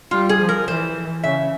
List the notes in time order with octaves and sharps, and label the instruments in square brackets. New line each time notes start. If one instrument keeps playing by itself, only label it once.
[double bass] G3 [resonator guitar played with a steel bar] F4
[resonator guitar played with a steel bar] G#4
[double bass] F3
[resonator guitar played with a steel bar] A#4
[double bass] E3 [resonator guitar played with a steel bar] C5
[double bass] C#3 [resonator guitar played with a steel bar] E5